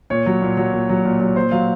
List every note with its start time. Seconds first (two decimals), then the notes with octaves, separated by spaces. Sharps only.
0.10 A#2 C#5
0.26 F#3
0.42 A#2
0.57 F#3
0.73 A#2
0.89 F#3
1.05 A#2
1.20 F#3
1.36 A#2 C5
1.51 F#3 F5